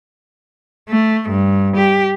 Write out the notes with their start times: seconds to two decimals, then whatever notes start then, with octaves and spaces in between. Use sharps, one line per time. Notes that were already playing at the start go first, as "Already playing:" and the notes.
0.89 A3
1.29 G2
1.76 G4